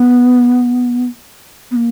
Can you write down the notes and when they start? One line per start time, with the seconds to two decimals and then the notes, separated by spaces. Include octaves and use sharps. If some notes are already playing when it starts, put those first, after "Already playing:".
Already playing: B3
1.71 B3
1.76 A#3